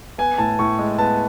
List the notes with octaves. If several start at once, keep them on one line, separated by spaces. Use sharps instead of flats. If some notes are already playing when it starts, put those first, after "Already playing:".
B3 G#5
A2 A5
A2 C#6
G#3
B3 A5